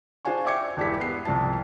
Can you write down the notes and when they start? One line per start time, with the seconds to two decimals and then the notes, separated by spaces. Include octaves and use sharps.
0.25 D4 F4 C5 F5 G#5 C#6
0.44 D5 E5 G5 D6 G#6 C#7
0.77 E1 G2 D4 E4 G4 B6
1.00 B3 C7
1.25 C2 F3 D5 A5